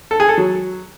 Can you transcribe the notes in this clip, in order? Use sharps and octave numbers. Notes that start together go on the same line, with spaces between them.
A4
G#4
A4
F#3